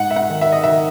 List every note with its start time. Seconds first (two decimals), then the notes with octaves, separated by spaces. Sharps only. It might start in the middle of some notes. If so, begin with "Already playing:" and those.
Already playing: G#2 F#5
0.11 E5
0.16 F#5
0.30 D#3
0.41 E5
0.52 D#5
0.64 D#3 E5